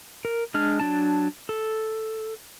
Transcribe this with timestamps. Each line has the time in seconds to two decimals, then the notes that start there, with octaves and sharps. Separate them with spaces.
0.25 A#4
0.54 G#3 D4 F6
0.80 F#3 D4 A5
1.49 A4